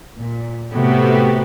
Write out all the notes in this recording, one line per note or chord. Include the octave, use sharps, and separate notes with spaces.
A#2
A2 C3 A3 B3 F#4 G4